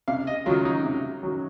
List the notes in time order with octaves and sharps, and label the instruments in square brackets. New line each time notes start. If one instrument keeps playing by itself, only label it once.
[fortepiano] C3 F5
D#5
D#3 F#3 F4
D#4
C3
D#3 F#3